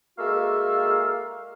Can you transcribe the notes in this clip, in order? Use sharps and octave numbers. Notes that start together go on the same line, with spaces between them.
G#3 A#3 F#4 A4 E5 F5